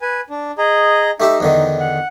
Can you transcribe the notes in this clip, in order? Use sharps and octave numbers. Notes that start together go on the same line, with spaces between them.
B4 G#5
D4
G#4 D#5 A#5
A3 D#4 G4 E5
E2 D3 D#3
F#5